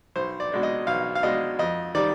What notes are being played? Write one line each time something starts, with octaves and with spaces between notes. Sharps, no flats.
B1 C5
D5
B2 G#3 D4
D#5
B1 F5
F5
B2 G#3 D4 D#5
F2 D#5
D#3 G3 D5